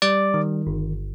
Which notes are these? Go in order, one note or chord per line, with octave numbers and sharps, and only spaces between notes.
G3 D5 D6
D#3
G1